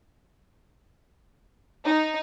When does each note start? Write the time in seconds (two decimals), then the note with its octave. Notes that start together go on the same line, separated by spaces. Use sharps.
1.84 D#4